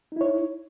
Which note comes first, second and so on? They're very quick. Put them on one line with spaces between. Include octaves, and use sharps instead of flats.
D#4 E4 C#5